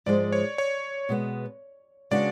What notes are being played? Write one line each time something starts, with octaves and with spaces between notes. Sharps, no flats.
G#2 F3 G#3 D5
C#5
C#5
B2 G#3 B3
C#3 G#3 B3 D4 F#4 D5